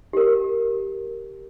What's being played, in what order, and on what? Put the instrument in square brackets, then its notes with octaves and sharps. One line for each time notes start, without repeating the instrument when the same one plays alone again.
[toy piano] G4 A#4